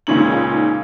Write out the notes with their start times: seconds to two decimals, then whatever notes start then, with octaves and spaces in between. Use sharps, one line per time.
0.07 C#2 A#2 C#4 D#4 F#7